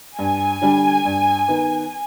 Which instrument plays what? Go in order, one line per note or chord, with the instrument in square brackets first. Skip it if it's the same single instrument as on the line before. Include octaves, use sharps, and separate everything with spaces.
[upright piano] G2 [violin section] G#5
[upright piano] D3 G3 D4
G2
D#3 B3 D#4 B4